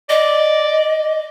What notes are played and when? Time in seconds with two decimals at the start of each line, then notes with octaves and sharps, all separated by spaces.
0.09 D5 D#5